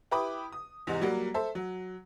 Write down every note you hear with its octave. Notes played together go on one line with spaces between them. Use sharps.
E4 G4 B4 B5 D6 D#6
D#6
E2 G#2 C3 D#4
F#3 G3 A#3 F#4
A4 C5 E5
F#3